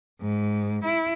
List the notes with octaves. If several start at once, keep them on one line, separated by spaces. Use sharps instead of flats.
G#2
E4